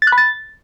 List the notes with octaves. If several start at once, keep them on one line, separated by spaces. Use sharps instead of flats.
A6
F#6
B5
A6